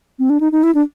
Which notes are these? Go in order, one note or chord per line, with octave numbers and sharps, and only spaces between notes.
C4
D4
D#4
D#4
E4
D4